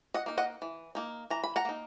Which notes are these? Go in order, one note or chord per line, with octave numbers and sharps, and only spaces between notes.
D#5 F#5
A#3 D#4
D#5 F#5
E3
A#3 D#4
E3 A#5
B5
F#5 A#5
A#3 D#4